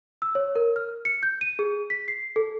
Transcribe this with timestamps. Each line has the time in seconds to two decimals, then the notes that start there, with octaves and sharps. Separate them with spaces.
0.22 E6
0.35 C#5
0.55 A#4
0.76 F6
1.05 C#7
1.23 G6
1.41 D#7
1.59 G#4
1.90 B6
2.08 C7
2.36 A4